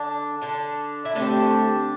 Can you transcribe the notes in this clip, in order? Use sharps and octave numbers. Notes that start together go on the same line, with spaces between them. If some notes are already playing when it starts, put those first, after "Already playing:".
Already playing: D3 D4
D3 D4
E4
D3 A3 C4 D4 G4